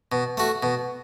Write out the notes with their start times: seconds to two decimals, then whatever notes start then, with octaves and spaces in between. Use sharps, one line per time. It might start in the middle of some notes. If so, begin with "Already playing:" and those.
0.12 B2
0.37 A3 F#4
0.63 B2